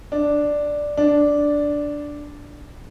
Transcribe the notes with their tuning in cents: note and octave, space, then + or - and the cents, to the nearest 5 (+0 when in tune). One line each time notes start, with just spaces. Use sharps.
D4 +0
D4 -5